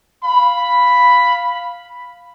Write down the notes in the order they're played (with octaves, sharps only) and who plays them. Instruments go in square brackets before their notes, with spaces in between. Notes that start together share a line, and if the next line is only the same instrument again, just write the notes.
[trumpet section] F5 B5